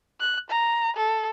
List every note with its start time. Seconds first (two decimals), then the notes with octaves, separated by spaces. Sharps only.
0.20 F#6
0.50 A#5
0.97 A4